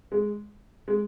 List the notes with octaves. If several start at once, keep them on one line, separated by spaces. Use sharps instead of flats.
G#3
G#3